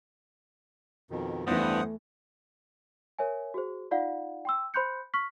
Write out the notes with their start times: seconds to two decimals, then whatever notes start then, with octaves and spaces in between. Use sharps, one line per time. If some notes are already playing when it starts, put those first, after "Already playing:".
1.11 F2 B2 D#3
1.47 E2 G2 E3 A3 C5 F#5 D#6
3.19 A#4 C#5 E5 G#5
3.54 F#4 G#4 C5
3.91 D#4 F4 D5 F5 F#5
4.45 G5 C6 E6
4.74 C5 B5 C6 F#6 G6 C#7
5.14 C#6 F6 B6